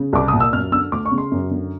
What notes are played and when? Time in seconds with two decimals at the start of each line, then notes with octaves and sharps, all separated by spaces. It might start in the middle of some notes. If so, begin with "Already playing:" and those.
Already playing: C#3
0.13 C2 D6
0.28 A#2 D#6
0.40 E6
0.53 F#2 F6
0.72 D3 E6
0.92 D2 D6
1.05 C#6
1.11 C#3
1.18 C6
1.31 F#2
1.51 D3